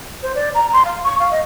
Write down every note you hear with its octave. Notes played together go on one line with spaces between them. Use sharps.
C5
D5
A#5
C6
F5
C#6
F5
D#5